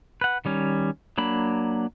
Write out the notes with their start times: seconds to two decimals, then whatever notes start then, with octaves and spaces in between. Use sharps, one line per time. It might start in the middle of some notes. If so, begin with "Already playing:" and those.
0.21 B4 F#5
0.45 D#3 G3 C#4
1.18 F#3 A#3 D4 B5